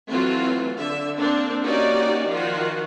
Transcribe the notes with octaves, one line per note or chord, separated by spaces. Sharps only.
E3 F#3 A3 C4 F4 F#4
D3 E5
A#3 C4 D4 A4
A#3 C#4 D#4 F#4 G4 D5
D#3 F3 F4 F#4